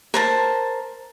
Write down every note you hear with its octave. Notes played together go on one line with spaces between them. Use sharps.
A#4 C5 A5